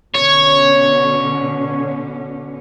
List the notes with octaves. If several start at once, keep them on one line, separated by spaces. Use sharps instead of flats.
B2 D3 C#4 C#5